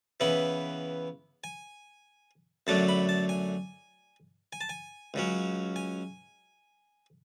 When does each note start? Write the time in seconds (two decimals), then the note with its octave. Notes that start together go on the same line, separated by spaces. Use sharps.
0.20 C#3 E3 B3 E4 F#5
1.44 G#5
2.67 F#2 D3 F#3 A3 D4 A5
2.89 B5
3.09 A5
3.29 G#5
4.53 G#5
4.61 A5
4.69 G#5
5.14 C#2 C#3 F#3 C#4
5.76 G#5